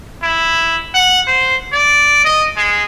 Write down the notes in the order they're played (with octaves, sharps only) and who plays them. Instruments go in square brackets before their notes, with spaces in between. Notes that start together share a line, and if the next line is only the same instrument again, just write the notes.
[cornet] E4
F#5
C5
D5
D#5
G#3